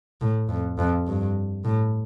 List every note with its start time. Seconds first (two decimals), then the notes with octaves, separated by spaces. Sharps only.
0.21 A2
0.49 F2
0.79 F2
1.07 G2
1.64 A2